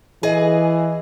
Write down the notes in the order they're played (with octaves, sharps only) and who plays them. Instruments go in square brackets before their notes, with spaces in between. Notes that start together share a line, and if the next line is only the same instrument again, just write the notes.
[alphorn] E3 [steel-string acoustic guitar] G#4 D#5